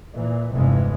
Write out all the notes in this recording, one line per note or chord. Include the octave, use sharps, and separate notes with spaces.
A#2 E3
F1 E2 G2 C3 E3 G#3